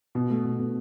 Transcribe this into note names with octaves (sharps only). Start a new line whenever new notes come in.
B2
A3
B2
B2